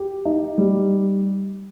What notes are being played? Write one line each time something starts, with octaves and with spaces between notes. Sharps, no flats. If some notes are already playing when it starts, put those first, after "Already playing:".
Already playing: G4
D#4
G3